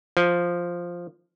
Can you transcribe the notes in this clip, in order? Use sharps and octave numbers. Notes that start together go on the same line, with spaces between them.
F3